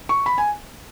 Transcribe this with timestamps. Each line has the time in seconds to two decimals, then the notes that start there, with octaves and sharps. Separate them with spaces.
0.09 C#6
0.26 B5
0.38 G#5